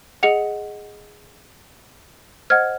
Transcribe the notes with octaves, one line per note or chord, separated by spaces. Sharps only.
G#4 D#5 F#5 C#7 F7
C5 D#5 F#5 F6 G#6